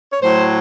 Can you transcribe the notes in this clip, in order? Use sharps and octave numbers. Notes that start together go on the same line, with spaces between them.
C#5
A2 F#3 C5